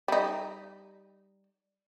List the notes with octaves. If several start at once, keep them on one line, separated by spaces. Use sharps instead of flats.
G3 D#4